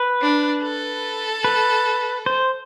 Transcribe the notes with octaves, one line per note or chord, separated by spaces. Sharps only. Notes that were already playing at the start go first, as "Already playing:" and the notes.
Already playing: B4
D4
A4
B4
C5